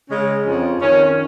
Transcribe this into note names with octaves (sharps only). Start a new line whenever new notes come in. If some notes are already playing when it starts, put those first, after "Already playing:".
C#3 G#3 C#4
F2 F3 C#4
F2 D#3 C#4